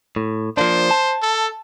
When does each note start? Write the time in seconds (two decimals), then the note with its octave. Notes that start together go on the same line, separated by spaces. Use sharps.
0.16 A2
0.57 F3 A#3 D4 C5
0.91 A5
1.22 A4